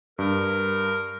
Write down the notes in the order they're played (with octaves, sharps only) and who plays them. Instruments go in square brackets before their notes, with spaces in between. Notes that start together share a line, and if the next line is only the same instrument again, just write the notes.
[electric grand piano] G2 [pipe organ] A#4